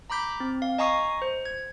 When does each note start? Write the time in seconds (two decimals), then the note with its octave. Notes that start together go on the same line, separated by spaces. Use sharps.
0.10 A#5 B5 D6 G6 B6
0.40 C4
0.62 F5
0.78 D#5 G#5 A#5 C#6 D#6 C7
1.22 C5
1.45 G#6